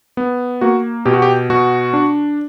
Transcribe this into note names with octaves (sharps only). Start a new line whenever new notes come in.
B3
A#3 F#4
B2 G4
F#4
G4
B2 F#4
D4